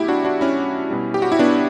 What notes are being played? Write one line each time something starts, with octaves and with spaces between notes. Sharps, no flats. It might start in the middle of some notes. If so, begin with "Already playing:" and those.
Already playing: B2 F#3 A3 E4 G4
D4 F#4
D4 F#4
C#4 E4
B2 G3
G4
F#4
E4
B3 D4